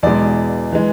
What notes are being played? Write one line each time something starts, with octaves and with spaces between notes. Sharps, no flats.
E2 B2 G#3 D5
E3 G#3